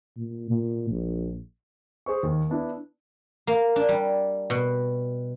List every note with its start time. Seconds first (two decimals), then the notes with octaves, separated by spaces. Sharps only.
0.17 A#2
0.50 A#2
0.90 A#1
2.06 G#4 C5 C#6
2.23 D#2
2.50 B3 D4 E4
3.47 A#3
3.76 D4
3.89 G3
4.50 B2